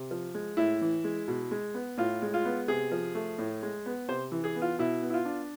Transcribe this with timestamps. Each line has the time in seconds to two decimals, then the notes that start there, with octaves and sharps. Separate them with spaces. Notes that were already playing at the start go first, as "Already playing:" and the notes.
Already playing: C3
0.11 F3
0.34 G#3
0.57 A2 E4
0.81 E3
1.04 G#3
1.28 B2
1.51 G#3
1.74 B3
1.97 A2 F4
2.22 G#3
2.34 F4
2.45 B3
2.68 C3 G#4
2.92 F3
3.15 A3
3.38 A2
3.63 G#3
3.86 B3
4.08 C3 C5
4.32 E3
4.44 G#4
4.56 B3
4.62 F4
4.79 B2 E4
5.02 B3
5.10 E4
5.14 F4
5.25 D4